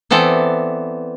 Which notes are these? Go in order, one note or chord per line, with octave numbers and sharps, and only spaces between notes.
E3 B3 C4 A4 D5